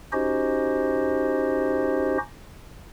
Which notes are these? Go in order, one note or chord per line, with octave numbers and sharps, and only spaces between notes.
C#4 D#4 F#4 G4 C5 D#5